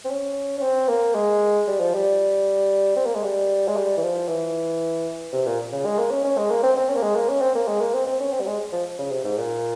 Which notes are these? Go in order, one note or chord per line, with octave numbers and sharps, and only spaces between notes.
C4
C#4
C#4
C4
A#3
G#3
G3
F3
G3
C4
A#3
G#3
G3
G#3
G3
E3
F3
E3
C3
A#2
C#3
G#3
A#3
C#4
C#4
G#3
A#3
C4
C4
C#4
A#3
G#3
A#3
C#4
C4
A#3
G#3
A#3
C4
C4
C#4
C4
G3
G#3
F3
C#3
C3
G#2
A#2